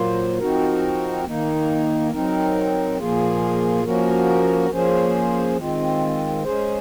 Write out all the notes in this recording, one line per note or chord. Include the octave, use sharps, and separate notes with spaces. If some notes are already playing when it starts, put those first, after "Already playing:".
Already playing: A#2 F#3 A#3 F4 C5
F3 C4 D#4 F#4 A#4
D#3 A#3 D#4
F#3 C4 D#4 A#4
A#2 F3 A#3 F4 G#4
F3 A#3 C#4 F#4 A#4
F3 A#3 C#4 G#4 C5
D#3 G#3 C4 F4
G#3 C#4 G#4 C5